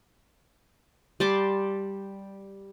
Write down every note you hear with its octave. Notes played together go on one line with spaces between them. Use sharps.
G3 A5 C6 D6